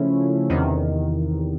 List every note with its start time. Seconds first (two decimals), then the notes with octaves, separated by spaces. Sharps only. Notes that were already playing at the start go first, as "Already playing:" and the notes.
Already playing: C#3 F3 A3 C#4 E4
0.49 E2 C3 D#3